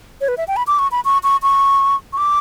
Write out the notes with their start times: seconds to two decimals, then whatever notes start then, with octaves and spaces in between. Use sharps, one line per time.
0.21 C#5
0.28 B4
0.38 E5
0.48 G5
0.57 B5
0.67 D6
0.79 C#6
0.92 B5
1.05 C#6
1.23 C#6
1.43 C#6
2.13 C#6
2.18 D6